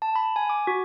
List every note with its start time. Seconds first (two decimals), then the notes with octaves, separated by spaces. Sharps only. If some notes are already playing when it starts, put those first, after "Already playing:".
0.02 A5
0.16 B5
0.36 G#5
0.49 D6
0.67 F#4